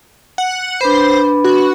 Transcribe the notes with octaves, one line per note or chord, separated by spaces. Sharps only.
F#5
D4 B4 C5 B5
F#4